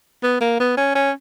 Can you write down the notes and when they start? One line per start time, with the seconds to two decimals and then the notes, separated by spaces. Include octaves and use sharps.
0.23 B3
0.41 A#3
0.60 B3
0.77 C#4
0.95 C#4